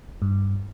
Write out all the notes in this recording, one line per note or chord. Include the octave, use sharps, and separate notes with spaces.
G2